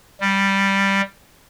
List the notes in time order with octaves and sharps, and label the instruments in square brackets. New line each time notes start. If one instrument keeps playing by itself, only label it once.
[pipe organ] G3